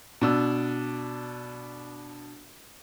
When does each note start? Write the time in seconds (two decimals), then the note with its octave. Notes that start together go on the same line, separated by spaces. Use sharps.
0.21 B2 D4 E6